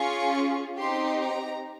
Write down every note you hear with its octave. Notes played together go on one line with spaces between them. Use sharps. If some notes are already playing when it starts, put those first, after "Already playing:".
Already playing: C#4 F4 G#4 C#6
C4 D#4 G4 C6
A#5